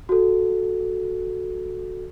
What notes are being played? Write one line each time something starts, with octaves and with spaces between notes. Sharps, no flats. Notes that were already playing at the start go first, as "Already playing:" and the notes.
F#4 A4